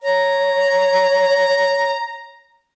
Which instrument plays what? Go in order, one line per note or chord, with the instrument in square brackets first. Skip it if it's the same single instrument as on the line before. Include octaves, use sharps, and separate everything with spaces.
[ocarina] C#5 [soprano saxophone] A#5